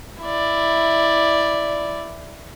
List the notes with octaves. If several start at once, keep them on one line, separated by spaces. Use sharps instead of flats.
E4 D5